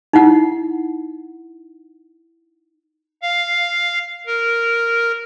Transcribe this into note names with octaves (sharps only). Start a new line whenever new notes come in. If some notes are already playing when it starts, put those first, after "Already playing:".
D#4 E4 F#5
F5
A#4